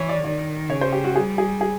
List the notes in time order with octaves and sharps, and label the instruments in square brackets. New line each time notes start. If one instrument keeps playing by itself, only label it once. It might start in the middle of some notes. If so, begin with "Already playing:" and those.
Already playing: [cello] E3 [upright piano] C#5
[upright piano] D5
[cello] D#3 [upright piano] D5
[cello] C#3 [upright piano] C#5
[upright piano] C5
G4
F#4
[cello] G3 [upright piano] G#4
[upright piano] G#4
G#4